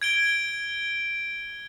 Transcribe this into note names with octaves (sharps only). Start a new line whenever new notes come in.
G#6 D7 G7